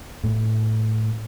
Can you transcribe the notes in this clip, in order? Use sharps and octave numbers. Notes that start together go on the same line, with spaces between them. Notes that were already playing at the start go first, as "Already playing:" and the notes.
A2